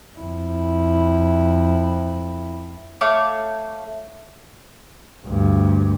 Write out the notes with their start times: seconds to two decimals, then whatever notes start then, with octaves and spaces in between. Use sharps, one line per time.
0.18 F2 E4
3.01 A3 C#5 F5 D6
5.26 D2 G2